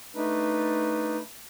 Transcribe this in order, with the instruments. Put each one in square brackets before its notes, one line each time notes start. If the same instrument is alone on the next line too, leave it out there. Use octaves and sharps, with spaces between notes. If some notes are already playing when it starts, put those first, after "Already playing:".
[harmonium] A3 D4 D#4 B4